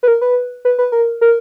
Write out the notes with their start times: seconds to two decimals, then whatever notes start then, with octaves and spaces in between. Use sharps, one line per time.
0.03 B4
0.08 A#4
0.21 B4
0.65 B4
0.79 B4
0.92 A#4
1.21 A#4